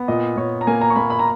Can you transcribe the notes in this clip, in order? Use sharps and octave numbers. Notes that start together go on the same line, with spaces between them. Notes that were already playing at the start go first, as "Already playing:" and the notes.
Already playing: B3
A#2 D#5
A#2 C#5
A#5
A#3 G#5
A#5
C#6
A#3 B5
B5
A#5